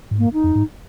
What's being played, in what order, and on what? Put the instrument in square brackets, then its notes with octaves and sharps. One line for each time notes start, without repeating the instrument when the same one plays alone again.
[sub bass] G#2
[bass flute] A#3
D#4
[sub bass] F2
G#2